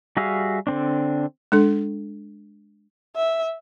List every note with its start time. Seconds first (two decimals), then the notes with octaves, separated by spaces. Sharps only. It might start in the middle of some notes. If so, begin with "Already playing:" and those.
0.17 G3 F#4 G#4 E5 F5
0.67 D3 C4 D4
1.52 G#3 D4 A4
3.16 E5